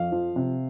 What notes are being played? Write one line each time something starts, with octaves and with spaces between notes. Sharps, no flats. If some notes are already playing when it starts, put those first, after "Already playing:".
Already playing: F2 F5
F3
C3